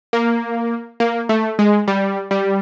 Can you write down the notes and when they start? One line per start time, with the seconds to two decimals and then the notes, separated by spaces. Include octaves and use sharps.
0.13 A#3
1.00 A#3
1.29 A3
1.59 G#3
1.88 G3
2.31 G3